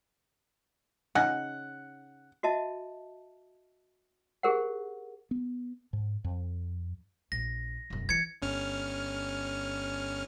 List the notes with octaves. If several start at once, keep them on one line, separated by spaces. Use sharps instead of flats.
C#3 C#4 D#4 F#5
F#4 D#5 E5 A5
G4 G#4 A#4 C5 F#5
B3
G#2
F2
A#1 A#6
E1 F#2
E3 G#6 C#7
G1 C#4 F6